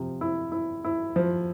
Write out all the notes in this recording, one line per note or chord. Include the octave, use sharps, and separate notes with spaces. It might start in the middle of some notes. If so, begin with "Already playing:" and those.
Already playing: C3 F3
E4
E4
E4
F3